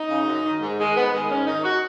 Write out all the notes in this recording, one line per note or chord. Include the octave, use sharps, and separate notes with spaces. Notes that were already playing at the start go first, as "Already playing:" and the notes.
Already playing: D#4
C#3
F#2
D#3
G#2
D#3 G#3
G#2 B3
D#3 G#3
G#2 C#4
D#3 D#4
F#4